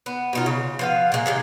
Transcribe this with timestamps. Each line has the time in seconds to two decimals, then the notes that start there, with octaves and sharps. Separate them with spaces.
0.06 B3
0.33 B2 D#4 F4
0.46 C#3
0.79 F3 B3 F5
1.12 A#2 G#3
1.26 C3 D#3 G#3